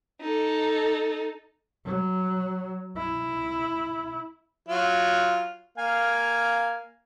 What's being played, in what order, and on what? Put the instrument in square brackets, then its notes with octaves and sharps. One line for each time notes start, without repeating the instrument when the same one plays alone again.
[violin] D#4 A4
[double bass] F#3
E4
[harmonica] F#3 F4
A#3 F5 G#5